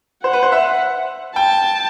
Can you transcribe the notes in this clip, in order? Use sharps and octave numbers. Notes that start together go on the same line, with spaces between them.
C5 F#5
B4
C5
E5
G5 A5